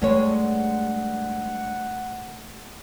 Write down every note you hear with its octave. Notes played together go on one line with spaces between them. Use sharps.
G2 G#3 A3 C#5 F#5